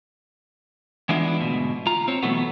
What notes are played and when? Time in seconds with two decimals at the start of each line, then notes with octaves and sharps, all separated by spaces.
1.09 E3 G#3 B3 D4 E4 F4
1.39 D2 G#2 B2
1.87 F4 A#5
2.08 C4 C#5
2.23 B2 E3 F#3 A3 B3